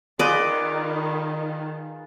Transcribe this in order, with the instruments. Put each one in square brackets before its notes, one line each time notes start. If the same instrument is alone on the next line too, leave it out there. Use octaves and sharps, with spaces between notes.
[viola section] D#3 [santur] F4 G#4 B4 [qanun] D5 D#5